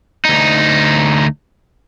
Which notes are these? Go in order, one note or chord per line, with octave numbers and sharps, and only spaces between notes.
D2 D#4